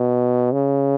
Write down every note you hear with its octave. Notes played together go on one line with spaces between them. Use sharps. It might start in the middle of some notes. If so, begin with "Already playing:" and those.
Already playing: B2
C#3